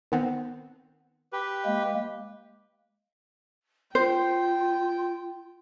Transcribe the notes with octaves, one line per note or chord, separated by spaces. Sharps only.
D#3 B3 C4
G4 B4
G#3 A#3
F4 C5 G5